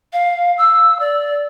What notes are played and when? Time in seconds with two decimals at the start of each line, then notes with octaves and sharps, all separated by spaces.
0.13 F5
0.58 E6
1.00 D5